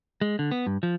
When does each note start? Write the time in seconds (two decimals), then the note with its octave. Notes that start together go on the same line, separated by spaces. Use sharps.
0.21 G#3
0.39 D3
0.52 B3
0.67 G2
0.83 F3